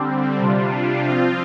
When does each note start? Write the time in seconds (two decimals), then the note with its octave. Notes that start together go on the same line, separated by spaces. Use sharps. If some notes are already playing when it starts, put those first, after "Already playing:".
Already playing: D3 G3 C4
0.40 C3 G3 D4 F4
1.06 F3 C4 F4